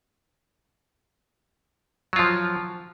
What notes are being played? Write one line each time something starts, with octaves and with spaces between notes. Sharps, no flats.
F3 F#3 F4